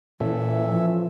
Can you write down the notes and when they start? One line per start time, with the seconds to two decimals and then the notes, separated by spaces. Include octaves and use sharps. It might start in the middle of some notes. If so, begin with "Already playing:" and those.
0.20 A#2 E3 C#4 A4 E5
0.67 F3